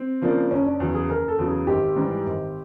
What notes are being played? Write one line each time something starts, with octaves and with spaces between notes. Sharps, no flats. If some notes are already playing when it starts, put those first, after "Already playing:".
Already playing: C4
C#3 F3 A#3 D4
F#1 C#4
D4
E2 C#3 F#3
G#4
F#1 A#4
A4
E2 C#3 F#3
G#4
G#1 G4
G#2 E3 G3
G#1